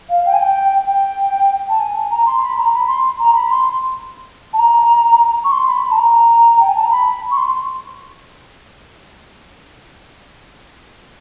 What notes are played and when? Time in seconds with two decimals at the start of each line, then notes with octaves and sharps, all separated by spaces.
0.09 F5
0.26 G5
0.33 G#5
0.40 G5
0.87 G5
1.69 A5
1.80 G#5
1.96 G#5
2.11 A#5
2.26 C6
2.42 B5
2.58 A#5
2.73 B5
2.88 C6
3.20 A#5
3.34 B5
3.50 C6
4.53 A5
4.59 A#5
5.44 C#6
5.52 C6
5.67 B5
5.83 B5
5.91 A5
5.98 A#5
6.60 G5
6.68 G#5
6.76 A5
6.83 A#5
6.90 B5
7.31 C#6
7.37 C6